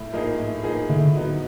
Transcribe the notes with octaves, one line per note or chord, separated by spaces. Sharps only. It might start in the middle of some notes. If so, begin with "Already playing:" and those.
Already playing: A2
F3 A#3 D#4 G#4
A2
F3 A#3 D#4 G#4
A2 D3
F#3 B3 D#4